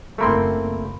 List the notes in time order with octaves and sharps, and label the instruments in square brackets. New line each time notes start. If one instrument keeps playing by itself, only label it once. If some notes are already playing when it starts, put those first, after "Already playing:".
[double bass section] F#1 [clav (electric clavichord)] A3 A#3 C4 [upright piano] A#4 B5 C6